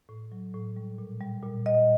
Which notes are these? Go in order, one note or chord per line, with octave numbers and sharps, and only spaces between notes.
A2
F#3
A2
G3
A#2
G3
A#2
G3 D#5